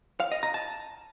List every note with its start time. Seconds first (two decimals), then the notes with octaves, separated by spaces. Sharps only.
0.20 F5
0.32 D#5
0.43 A#5
0.54 A5